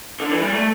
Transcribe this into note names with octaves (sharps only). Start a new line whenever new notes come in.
D3
E3
G3
A3